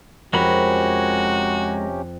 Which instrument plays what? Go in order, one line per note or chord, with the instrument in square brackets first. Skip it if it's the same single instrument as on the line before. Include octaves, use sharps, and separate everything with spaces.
[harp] F2 [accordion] C3 C#4 G4 [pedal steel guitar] G#3 A#4 B5 [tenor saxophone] F#4